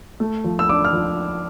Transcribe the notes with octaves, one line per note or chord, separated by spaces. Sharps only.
A3
F3
E6
D4 D6
F6
F3